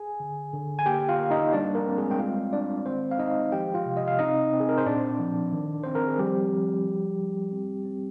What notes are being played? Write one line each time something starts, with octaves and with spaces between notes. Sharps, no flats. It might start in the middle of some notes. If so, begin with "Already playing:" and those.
Already playing: G#4 G#5
D3
D3
G#5
A#3 G4 G5
F4 F5
A#3
D#4 D#5
G3 D4 D5
A#3 A#4
C4
G#3 G#4
G5
G#3 F4 F5
G#3 D4 D5
D#3 C4 C5
F5
G#3 D#4 D#5
F3 G4 G5
F4 F5
C3
D#5
F5
C4 D#4 D#5
C4
G#4
A#4
C5
A#2 D4 D5
F3
D#3
C4 C5
A#4
G#4
F3 G3 G4
F3
G3
G3
C4
C4